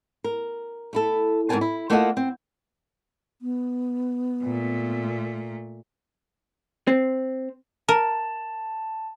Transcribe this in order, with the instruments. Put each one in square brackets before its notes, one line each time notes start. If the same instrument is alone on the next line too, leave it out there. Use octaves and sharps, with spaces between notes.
[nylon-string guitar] A#4
A3 E4 A4
E2 G#2 C4 A#4 G#5 A5
E4
A3 A#3 F4 A4 D#5 F#5
C4
[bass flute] B3
[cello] A#2 A3
[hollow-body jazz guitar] C4
[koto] A#4 [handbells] A5